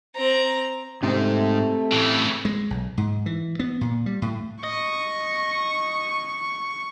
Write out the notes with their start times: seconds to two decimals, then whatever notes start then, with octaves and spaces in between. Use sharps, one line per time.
0.16 C4 A#5
1.03 G#2 C3 A3 C4 D#4
1.93 A2 C#3 E3
2.45 G#3
2.70 B1
2.98 G#2
3.26 E3
3.59 B3
3.81 A#2
4.06 G3
4.22 A2
4.63 D#5 C#6